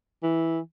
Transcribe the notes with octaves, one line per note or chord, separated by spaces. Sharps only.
E3